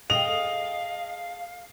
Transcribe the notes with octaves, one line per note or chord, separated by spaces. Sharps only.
G#4 A4 D#5 F5 G5 F7